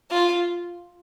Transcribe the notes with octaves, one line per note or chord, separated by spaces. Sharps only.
F4